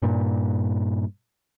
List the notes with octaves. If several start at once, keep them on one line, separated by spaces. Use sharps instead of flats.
G2 A#2